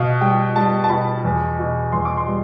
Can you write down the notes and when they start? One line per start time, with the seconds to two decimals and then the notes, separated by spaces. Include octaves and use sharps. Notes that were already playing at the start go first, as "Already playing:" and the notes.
Already playing: B2 F5
0.21 G3 G5
0.56 G3 A5
0.84 A5
0.90 B2 B5
1.25 E2
1.59 B2
1.92 E2 C6
2.05 D6
2.17 C6
2.27 G3